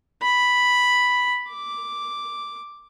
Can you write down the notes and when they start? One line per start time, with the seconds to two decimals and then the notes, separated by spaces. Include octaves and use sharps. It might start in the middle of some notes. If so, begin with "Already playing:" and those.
0.22 B5
1.50 D6